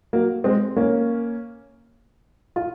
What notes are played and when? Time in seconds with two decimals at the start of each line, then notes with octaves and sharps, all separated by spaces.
0.13 F#3 A#3
0.44 G#3 C4
0.76 A#3 C#4
2.56 F4